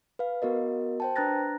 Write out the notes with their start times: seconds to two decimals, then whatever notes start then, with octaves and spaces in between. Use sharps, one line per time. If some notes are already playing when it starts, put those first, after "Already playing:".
0.19 B4 F5
0.42 B3 F#4 A#4 D#5
1.00 C5 G5 A5
1.16 D4 B4 A#5 F#6 A6 A#6